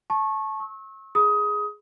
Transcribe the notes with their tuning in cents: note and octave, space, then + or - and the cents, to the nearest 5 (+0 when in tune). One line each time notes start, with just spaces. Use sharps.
A5 -15 C#6 -20
C#6 -35 E6 -30
G#4 +0 B5 +0 D#6 +20